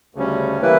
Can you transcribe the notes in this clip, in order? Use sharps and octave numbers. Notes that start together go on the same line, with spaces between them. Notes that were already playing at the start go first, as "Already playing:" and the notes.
D2 C#3 G3 C#4
E3 G3 A#3 E4 B4